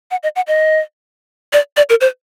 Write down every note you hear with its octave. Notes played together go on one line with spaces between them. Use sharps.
F#5
D#5
F#5
D#5
D5
D5
A#4
C5